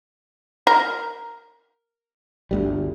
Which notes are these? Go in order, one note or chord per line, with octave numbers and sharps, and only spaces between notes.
A#4
G1 D2 G3